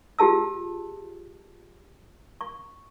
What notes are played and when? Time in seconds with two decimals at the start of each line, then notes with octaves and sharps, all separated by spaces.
0.19 F4 G4 G#4 A5 E6
2.41 C#6